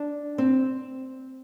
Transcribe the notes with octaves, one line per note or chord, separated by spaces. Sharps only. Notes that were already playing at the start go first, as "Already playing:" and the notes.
Already playing: D4
C4